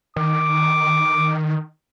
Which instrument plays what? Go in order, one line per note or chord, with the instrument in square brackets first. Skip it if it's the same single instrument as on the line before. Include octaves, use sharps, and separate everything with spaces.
[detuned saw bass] D#3 [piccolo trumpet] D6